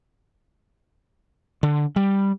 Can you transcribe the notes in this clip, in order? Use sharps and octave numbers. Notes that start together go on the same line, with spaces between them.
D3
G3